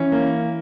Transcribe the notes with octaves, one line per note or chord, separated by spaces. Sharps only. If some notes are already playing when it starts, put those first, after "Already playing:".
Already playing: E3 C#4
A#3